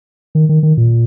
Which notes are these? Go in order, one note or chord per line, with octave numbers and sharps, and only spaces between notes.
D#3
D#3
D#3
A#2